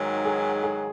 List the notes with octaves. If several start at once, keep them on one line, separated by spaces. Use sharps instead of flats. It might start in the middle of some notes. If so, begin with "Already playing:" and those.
Already playing: G#2 D#3 F#3 F#4
G#4
G#4